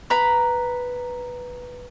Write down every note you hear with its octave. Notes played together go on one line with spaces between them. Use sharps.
B4 A#5 B5